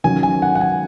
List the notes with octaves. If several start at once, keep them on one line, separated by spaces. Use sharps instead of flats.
D#3 F#3 C#4 G#5
G#5
F#5
F#5
G#5